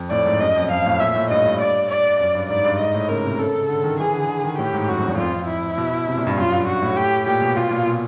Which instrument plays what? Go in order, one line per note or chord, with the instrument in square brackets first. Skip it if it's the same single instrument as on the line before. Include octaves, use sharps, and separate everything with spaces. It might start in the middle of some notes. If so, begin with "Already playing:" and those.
Already playing: [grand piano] F2
[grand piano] A2 [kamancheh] D5
[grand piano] G#2
[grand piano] F#2 [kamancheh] D#5
[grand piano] F2
[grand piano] F2 [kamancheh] F5
[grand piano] A2
[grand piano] A#2 [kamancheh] E5
[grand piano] A2
[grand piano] G2 [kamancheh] D#5
[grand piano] G2
[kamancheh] D5
D5
[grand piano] F#2 [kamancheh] D5
[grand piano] G2
[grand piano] G#2 [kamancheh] D5
[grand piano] G2
[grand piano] G#2 [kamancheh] D#5
[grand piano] A2
[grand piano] C#3 [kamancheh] A#4
[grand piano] C3
[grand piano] C#3 [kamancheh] A4
[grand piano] C#3
D3
D#3
[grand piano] E3 [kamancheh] G#4
[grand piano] D3
D3
D#3
[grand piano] A2 [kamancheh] G4
[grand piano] G#2
[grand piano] F#2 [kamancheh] F#4
[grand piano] F2
E2
[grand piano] F2 [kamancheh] F4
[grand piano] F2
[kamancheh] E4
[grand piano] B2
C3
A#2
G2
[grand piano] F#2 [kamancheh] F4
[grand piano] G2
[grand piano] G2 [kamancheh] F#4
[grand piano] A2
[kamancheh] G4
[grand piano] A#2 [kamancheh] G4
[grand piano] B2
[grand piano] B2 [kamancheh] F4
[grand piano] A#2
B2